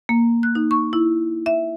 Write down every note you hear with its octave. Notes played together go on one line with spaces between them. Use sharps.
A#3
F#6
D#4
C#6
E4
E5